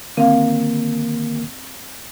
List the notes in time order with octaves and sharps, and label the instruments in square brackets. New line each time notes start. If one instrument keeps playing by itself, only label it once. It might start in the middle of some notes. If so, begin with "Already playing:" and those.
[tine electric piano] D3 D#3 A#3 [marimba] C4 F5